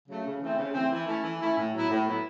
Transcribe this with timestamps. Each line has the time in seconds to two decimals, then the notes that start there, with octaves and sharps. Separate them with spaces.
0.08 C#3 F#3 A3
0.25 C#3
0.41 E3 A3 C4
0.58 C#3
0.74 E3 A3 C4
0.91 E3
1.07 A3 C#4 E4
1.24 E3
1.40 A3 C#4 E4
1.57 A2
1.73 F#3 B3 E4
1.90 A2
2.06 F#3 B3 E4